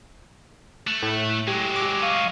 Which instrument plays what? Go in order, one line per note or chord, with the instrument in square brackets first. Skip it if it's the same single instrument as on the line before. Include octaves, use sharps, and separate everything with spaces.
[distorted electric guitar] A3 [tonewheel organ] F#6
[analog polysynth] A2
[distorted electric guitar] F#3 G#3 [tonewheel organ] G4
[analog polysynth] D6
[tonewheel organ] F5 C#6 D#6